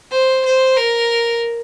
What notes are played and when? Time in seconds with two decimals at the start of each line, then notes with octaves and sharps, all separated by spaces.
0.11 C5
0.45 C5
0.77 A#4